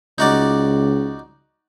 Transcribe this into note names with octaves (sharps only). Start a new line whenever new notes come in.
C#2 D#4 F#4 D5